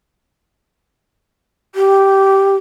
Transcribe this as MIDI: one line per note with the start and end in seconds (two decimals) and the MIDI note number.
1.75 2.55 67